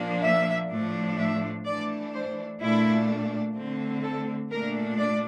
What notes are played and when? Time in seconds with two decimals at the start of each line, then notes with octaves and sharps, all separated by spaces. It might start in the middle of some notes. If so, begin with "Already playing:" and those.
Already playing: A#2 F3 A#3 D4
0.24 E5
0.71 A2 F3 A3 D4
1.19 E5
1.65 E3 A3 D4 D5
2.13 C5
2.61 A#2 A3 D4 E4
3.55 D3 A3 C4
4.03 A4
4.50 A#2 A3 D4 A#4
4.98 D5